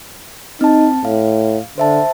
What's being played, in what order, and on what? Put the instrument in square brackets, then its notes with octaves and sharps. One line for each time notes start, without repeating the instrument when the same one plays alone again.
[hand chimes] C4 A5 [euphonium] D#4
[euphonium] A2 [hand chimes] F5
[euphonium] D3 [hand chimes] C5 E5 A5